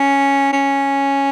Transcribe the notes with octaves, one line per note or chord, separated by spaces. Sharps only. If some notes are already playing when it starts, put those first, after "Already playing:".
Already playing: C#4
C#4